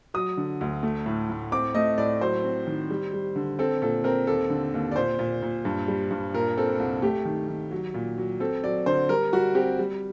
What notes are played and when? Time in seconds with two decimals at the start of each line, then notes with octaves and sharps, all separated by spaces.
0.14 F#3 D#6
0.37 D3
0.61 D2
0.83 A3
1.06 A2
1.30 A2
1.52 C4 D6
1.75 A3 D#5
1.98 A2 D5
2.21 F#3 C5
2.44 C4
2.67 D#3
2.90 G3
3.13 G3
3.36 D3
3.59 C4 A4
3.82 A#2 A4
4.04 C4 A#4
4.27 D#2 A4
4.50 D3
4.74 D#2
4.92 D5
4.96 A#2 C5
5.19 A#2
5.43 A#2
5.65 G2
5.88 G3
6.11 G2
6.34 A#2 A#4
6.57 C4 A4
6.79 C2
7.02 A3 G4
7.25 D#3
7.49 D#3
7.71 F#3
7.94 A#2
8.18 F#3
8.40 C4 A4
8.64 F#3 D5
8.86 D3 C5
9.09 G3 A#4
9.33 G3 F#4
9.55 C4 G4
9.79 G3